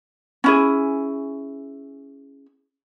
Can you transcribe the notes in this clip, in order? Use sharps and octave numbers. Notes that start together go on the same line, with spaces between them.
C#4 E4 G#4